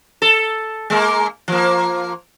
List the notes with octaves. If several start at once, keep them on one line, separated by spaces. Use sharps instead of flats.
A4
G#3 A#3
F3 A#3